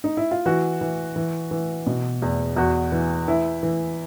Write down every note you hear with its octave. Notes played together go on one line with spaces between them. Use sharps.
D#4
E4
F4
E3 F#4
E3
E3
E3
B2
E2
E2 F#4
E3
E3 E4
E3